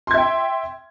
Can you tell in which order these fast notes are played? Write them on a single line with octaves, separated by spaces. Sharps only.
C6 G#6 E5 G5